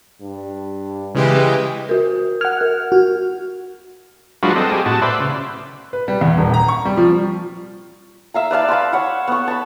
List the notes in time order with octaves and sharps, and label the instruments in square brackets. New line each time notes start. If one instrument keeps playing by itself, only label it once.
[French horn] G2
[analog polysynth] C#3 G#3 G4 [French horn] E3
[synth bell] F#4 A#4
[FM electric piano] F#5 F6 [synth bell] G#6
[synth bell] A#4
[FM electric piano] F#4
[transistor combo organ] F#3 G#3 D4 F4 F#4 B4
C4 A4 D#5
G4 G#4
A2 F#4 A5
B4 C5 D5 E5
C#3
[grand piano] B4
G3
E2
D#1
A#5
C#6
G3
F3
[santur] E5 F5 A#5
B4 D5 F5 A5
F5 A5 B5 C6
C#5 F#5 B5
B3 C#6
A5 B5